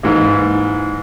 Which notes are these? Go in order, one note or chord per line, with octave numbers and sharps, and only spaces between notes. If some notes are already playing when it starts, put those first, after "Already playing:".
G#2 E3 A#3